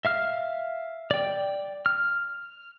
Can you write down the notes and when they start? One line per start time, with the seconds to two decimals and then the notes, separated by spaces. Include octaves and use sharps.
0.05 E5 F5 F6
1.11 D5 G5
1.86 F6